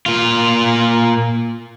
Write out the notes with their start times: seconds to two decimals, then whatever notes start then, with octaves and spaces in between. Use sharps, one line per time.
0.06 A#2 F4